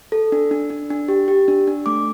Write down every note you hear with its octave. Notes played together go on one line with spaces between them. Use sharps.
A4
D4
D4
D4
D4
G4
G4
D4
D4
A3 D6